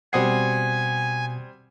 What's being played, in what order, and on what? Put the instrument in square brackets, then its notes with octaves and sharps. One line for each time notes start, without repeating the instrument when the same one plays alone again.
[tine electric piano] B2 D#6 C7 [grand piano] G3 C4 F#5 [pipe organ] G#5